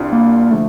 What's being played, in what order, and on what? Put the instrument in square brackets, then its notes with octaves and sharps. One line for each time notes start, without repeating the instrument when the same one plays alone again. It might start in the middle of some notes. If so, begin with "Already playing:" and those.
Already playing: [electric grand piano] C2 C3 G3 D4 F4
[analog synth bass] A#3
[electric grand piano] D3 F3 [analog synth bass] A3